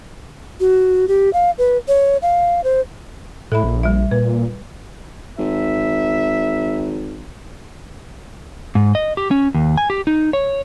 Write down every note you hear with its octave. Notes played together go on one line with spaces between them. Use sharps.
F#4
G4
F5
B4
C#5
F5
C5
A2 A4 E5 B5
A#1
G3 E5
A#2 B4
G#1 E5
G#2
D#5
G4
C#4
D#2
G#5
G4
D#4
C#5